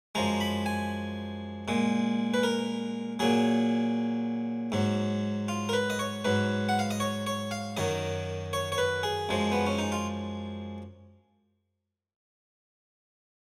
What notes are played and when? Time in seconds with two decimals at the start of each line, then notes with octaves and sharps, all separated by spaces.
0.15 F#2 F3 G#3 A#5
0.40 B5
0.66 G#5
1.68 A#2 G#3
2.34 B4
2.43 A#4
3.19 A#2 F#3 G#4
4.72 G#2 F#3
5.48 F4
5.69 A#4
5.73 B4
5.90 D#5
5.99 C#5
6.25 G#2 F#3 B4
6.69 F#5
6.79 F5
6.91 D#5
7.00 C#5
7.27 C#5
7.51 F5
7.77 F#2 D#3 F#3 D#5
8.53 C#5
8.72 C#5
8.78 B4
9.03 G#4
9.29 F#2 F3 G#3
9.52 B3
9.66 C#4
9.79 D#4
9.92 F4